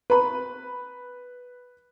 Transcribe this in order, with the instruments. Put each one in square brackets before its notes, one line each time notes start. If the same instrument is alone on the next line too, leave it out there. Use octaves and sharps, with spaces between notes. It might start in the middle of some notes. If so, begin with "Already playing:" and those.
[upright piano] B4 B5